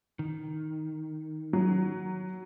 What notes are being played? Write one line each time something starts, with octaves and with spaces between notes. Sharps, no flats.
D#3
F#3